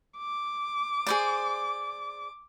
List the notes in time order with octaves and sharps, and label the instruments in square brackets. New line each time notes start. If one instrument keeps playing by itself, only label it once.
[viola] D6
[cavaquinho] G#4 C5 D5